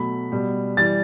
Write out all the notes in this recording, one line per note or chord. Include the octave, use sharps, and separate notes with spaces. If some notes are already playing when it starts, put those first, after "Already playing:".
Already playing: B2 F#3 A3 B5
B2 G3
E3 G3 A6